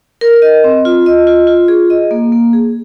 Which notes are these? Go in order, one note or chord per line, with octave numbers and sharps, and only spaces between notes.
A#4
D#5
C4
F4
D#5
F4
F4
G#4
D#5
A#3
A#3
G#4